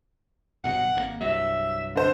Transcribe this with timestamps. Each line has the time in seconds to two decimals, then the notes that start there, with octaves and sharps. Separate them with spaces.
0.64 G1 B2 F#3 F#5
0.95 G#1 D#3 A#3
1.21 C2 G2 F#3 E5
1.96 D3 C5